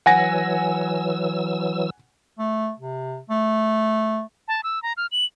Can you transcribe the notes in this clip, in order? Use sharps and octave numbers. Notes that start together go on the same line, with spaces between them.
E3 F#3 F#5 G#5 E6 A#6
A3
C3
A3
A5
E6
A#5
F6
F#7